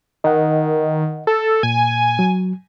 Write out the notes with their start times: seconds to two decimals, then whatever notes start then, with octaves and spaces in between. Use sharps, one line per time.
0.24 D#3 D#5 F#5
1.27 A4
1.63 A#2 G#5
2.19 F#3